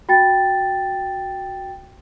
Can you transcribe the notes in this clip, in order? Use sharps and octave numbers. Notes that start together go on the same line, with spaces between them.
F#4 G5 A6